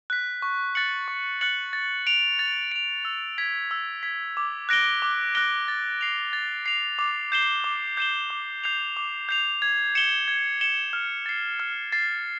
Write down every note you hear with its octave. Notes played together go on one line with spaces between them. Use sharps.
F#6 B6
C#6
F#6 A6 C#7 F#7
C#6
F#6 A6 C#7 F#7
A6
D7 F7
A6
D7 F7
E6
G#6 B6
E6
G#6 B6
D6
F#6 A#6 D7 G7
D6
F#6 A#6 D7 G7
A6
C7 F7
A6
C7 F7
D6
G6 C7 E7 G7
D6
G6 C7 E7 G7
D6
G6 C7 F7
D6
G6 C7 F7
G#6
C#7 E7 G7
G#6
C#7 E7 G7
F6
A6 C7
F6
A6 C7